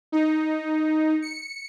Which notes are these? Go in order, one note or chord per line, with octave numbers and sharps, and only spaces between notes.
D#4
C#7